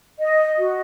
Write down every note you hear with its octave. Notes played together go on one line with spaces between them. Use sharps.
D#5
F#4